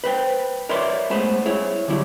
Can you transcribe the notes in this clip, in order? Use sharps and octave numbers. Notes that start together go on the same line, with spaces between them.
B4 C5 G5
A#4 B4 C#5 D5 E5 C6
G#3 A3 B3 B4 C5
E4 G#4 C#5
D3 F#3 G3 E4